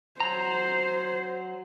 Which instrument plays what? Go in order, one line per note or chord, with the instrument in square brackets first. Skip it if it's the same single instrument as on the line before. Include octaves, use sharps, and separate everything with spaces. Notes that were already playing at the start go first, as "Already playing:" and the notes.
[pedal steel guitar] F#3 A#5 [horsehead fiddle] C5